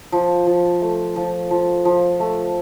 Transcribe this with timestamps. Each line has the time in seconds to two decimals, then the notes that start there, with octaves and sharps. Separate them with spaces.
0.12 F3
0.47 F3
0.82 A3
1.16 F3
1.51 F3
1.85 F3
2.20 A3